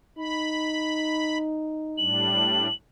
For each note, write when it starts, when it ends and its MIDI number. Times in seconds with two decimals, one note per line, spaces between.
0.18 2.09 63
0.18 1.38 83
1.98 2.68 45
1.98 2.68 55
1.98 2.68 62
1.98 2.73 102